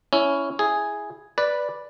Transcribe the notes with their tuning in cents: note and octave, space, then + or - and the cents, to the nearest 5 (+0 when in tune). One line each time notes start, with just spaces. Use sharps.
C#4 +10 E4 +0
E4 -10 G#4 +0
B4 -5 D5 +0